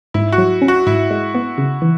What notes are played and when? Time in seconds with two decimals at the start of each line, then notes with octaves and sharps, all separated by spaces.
0.14 G#2 E4
0.32 F#4
0.38 F#3
0.62 C#4
0.68 F#4
0.87 G#2 E4
1.11 G#3
1.35 B3
1.58 C#3
1.82 E3